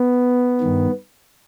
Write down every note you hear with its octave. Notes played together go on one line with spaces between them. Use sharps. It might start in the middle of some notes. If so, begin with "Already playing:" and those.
Already playing: B3
G2 D#3